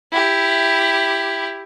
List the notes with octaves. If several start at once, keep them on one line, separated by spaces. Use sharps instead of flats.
E4 G4